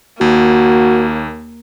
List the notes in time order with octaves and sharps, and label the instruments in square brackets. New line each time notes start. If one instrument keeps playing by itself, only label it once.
[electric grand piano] D#2 [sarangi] A#3 [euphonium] F#4